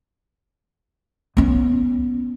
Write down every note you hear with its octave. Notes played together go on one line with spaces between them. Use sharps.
B3 C#4